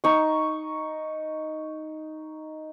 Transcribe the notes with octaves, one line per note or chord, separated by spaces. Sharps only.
D#4 C#6